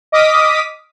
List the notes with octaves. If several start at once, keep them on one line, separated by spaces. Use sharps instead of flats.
D#5 D6 D#6 F6 B6